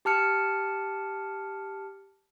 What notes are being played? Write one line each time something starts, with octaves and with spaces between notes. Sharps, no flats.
G4 A5 F6 C#7